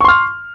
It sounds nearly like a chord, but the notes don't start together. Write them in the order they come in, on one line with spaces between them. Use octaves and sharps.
C#6 C6 F6